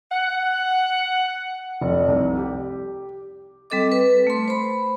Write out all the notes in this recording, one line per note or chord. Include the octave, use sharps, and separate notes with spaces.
F#5
F1
C2
G4
G3 C4 A4 D#5 D6
B4
A3 C6
C5 B5